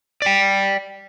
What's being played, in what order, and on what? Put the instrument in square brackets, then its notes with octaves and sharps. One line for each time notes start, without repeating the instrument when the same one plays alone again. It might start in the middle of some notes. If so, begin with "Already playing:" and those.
[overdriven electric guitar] D5 G5